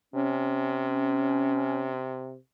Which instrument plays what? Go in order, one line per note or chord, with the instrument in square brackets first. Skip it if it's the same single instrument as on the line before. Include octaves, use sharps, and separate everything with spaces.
[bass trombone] C3 [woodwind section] C#4